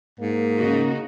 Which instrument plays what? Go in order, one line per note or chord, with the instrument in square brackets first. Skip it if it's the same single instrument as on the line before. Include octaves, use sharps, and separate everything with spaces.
[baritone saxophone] G#2 [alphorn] A#3
[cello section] C#3 D#4 F#4